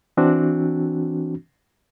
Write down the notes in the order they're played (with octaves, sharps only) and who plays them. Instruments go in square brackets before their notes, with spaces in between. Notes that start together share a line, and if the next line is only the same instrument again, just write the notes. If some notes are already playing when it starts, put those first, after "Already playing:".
[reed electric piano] E3 C4 D4 F#4